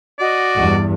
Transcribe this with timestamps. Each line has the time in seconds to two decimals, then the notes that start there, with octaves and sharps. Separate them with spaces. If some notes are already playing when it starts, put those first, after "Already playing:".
0.19 F#4 D5 D#5
0.57 E2 G2